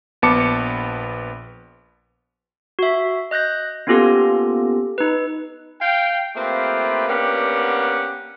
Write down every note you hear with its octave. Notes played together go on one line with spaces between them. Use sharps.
A#1 B3 A5 D6 C#7
F#4 E5
D#5 F#6 G6 A#6
A#3 B3 C#4 F4 G4 A4
D#4 B4
F5 G5
A3 A#3 C4 F4 G4 B4
A#3 B3 C#4 D4 G4 F#5